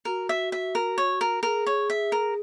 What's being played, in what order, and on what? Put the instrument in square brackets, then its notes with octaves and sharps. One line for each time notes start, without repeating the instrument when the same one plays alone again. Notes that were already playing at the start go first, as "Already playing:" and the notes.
[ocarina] F#4 [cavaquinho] A#4
[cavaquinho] E5
E5
A#4
C#5
A#4
[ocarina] G#4 [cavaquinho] A#4
[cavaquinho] C#5
E5
A#4